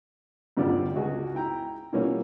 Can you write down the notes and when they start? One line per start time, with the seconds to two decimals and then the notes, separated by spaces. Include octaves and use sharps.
0.57 E2 G2 D3 F3 G4 D5
0.95 C#2 F#4 G#4
1.35 E4 G5 A#5
1.93 B2 E3 F3 G3 A#3 C#4